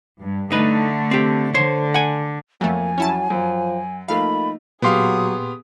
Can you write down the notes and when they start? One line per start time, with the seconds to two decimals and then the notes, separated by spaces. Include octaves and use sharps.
0.20 G2
0.52 D3 A3 D#4 B4
1.11 C4 G4
1.54 D3 C5 C#5
1.94 F#5 G#5
2.61 F2 F#3 A3 A#3 G#5
2.98 F#3 C#4 E4 A5
3.30 F#2 F3
4.08 F3 A3 A#3 D#4 F5 B5
4.82 A#2 F#3 B3 G4 G#4 F5 C6 D#6